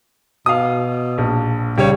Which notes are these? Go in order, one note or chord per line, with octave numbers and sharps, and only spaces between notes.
B2 F5 D#6
A#1
C#2 G3 C#5